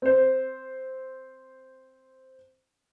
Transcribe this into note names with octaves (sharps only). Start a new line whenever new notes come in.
C4 C5